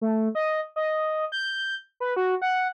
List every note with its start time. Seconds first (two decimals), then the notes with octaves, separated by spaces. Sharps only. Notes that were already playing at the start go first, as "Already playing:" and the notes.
0.01 A3
0.35 D#5
0.76 D#5
1.32 G6
2.00 B4
2.16 F#4
2.42 F#5